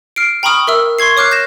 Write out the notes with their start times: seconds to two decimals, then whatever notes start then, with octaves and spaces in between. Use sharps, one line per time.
0.16 F6 C7 D7
0.43 G5 A#5 B5 C#6 D#6 F6
0.68 A#4 E5 E6
0.99 C6 C#6 G#6 C7
1.17 C#5 D6 F6 F#6 C7
1.31 G6 A#6 E7